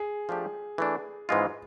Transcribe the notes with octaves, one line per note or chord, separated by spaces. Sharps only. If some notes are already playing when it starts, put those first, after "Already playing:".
Already playing: G#4
F3 A3 D4 G4
E3 A3 D4
G#2 E3 G#3 C#4 F4